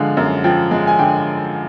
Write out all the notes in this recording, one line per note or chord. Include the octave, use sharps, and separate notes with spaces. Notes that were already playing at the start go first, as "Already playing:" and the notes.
Already playing: D3 F3 G#3 F5
F#2
F3 G5
G#3
G#5
D3 G5